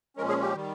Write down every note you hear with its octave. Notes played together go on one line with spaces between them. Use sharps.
A#2 F3 G#3 C#4 A#4
G#4
G4
D#3 G3